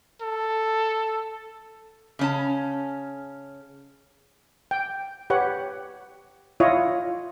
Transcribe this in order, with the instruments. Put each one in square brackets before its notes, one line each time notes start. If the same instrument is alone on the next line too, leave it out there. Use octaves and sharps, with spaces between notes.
[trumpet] A4
[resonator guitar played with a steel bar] C#3 C#4 A5
[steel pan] G5
G4 B4 C#5 F#5
E4 F4 C#5 D#5